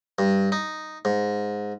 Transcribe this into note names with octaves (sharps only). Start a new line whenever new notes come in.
G2
D#4
G#2